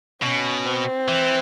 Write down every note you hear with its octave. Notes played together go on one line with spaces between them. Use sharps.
B2 C#4
C4
E3